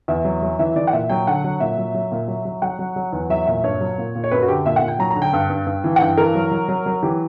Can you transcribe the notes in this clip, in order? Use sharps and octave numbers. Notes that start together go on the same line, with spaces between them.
E2 E5
F#3
F#3
E3 E5
E3 D5
F#5
A#2 E5
F#3 G5
D3 F#5
F#3
A#2 E5
F#3
F#3
A#2
F#3
F#3
F#3 F#5
F#3
F#3
E2
F#3 E5
A#2 E5
G2 C#5
F#3
A#2
A#2
C#5
F#2 B4
F#4
D3 G4
A#2 E5
F#5
A#2
G5
F#3 A#5
D3 A#5
G5
G2
G2
G2
E3
F#5
G2 G5
E3 A#4
F#3
F#3
F#3
F#3
E3 G4